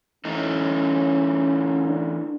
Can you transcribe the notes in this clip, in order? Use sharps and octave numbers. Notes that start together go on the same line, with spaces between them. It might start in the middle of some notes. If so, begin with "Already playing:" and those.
E3 A3 C#4 D#4
D4